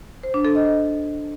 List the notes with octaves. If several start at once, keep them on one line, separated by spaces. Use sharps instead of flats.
C5
D4
A4
D#5